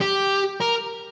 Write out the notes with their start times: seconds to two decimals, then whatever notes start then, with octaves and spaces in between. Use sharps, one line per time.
0.01 G4
0.60 A#4